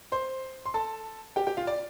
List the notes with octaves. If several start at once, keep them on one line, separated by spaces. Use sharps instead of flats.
C5 C6
C6
A4 A5
G4 G5
G4 G5
F4 F5
D5